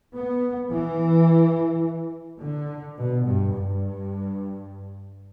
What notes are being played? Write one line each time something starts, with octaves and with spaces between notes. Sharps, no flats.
B3
E3
D3
B2
G2
G2